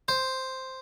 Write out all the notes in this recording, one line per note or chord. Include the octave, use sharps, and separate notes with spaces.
C5